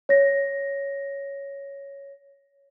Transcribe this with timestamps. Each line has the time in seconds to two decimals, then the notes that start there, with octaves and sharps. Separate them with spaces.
0.09 C#5 A#6